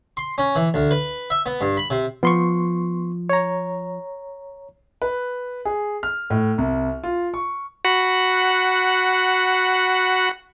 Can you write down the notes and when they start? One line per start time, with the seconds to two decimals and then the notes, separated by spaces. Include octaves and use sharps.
0.17 C6
0.38 C#4
0.55 E3
0.74 D2
0.91 B4
1.30 E5
1.46 B3
1.61 G2
1.77 B5
1.90 C3
2.23 F3 B3 C6 C#6
3.29 C#5 A#5
5.02 B4
5.65 G#4
6.03 F6
6.30 A2
6.58 C2
7.04 F4
7.34 C#6
7.85 F#4 F#5 B5